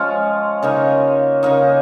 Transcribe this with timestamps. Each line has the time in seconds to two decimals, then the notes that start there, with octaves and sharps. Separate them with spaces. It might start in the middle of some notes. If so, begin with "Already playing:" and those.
Already playing: F3 G#3 C#4 F4
0.62 C#3 A#3 D#4
1.43 C#3 A#3 D#4